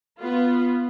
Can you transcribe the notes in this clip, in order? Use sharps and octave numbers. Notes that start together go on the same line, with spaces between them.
B3 F4